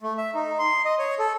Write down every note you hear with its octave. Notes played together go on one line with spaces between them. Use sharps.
A3
E5
D#4
C6
D#5
C#5
A4